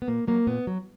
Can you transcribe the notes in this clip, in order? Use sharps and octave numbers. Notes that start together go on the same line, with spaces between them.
B3
A#2 A#3
F#3 A#3
A#2 B3
F#3